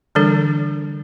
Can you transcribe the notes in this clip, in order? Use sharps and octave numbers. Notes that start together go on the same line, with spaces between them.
D3 E3 G3 D4 A4